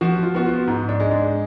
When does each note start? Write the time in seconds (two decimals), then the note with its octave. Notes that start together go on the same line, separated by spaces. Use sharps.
0.01 F3 F#4
0.23 F4
0.35 B3 F#4
0.45 F4
0.67 G#2
0.89 D4
1.00 G#3
1.11 D4